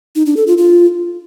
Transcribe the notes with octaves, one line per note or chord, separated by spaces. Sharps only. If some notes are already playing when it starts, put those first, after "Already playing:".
D#4
D4
A4
F4
F4